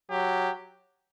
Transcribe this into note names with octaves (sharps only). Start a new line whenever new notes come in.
F#3 G4